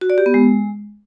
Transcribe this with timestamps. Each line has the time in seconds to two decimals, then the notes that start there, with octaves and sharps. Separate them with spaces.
0.01 F#4
0.10 D5
0.18 G4
0.26 B3
0.34 G#3